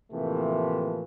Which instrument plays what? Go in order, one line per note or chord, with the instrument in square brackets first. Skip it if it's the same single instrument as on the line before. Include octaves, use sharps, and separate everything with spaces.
[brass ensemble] A2 C3 E3 F3 A3 A#3